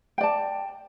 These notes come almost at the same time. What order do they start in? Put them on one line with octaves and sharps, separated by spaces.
G5 D5 A5